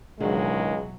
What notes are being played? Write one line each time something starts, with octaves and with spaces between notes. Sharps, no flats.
C#2 B2 D#3 E3 F#3 G#3 D4 G#4